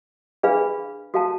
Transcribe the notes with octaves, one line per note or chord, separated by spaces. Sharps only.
D4 G#4 B4 F5 B5
F#4 A4 F5 A5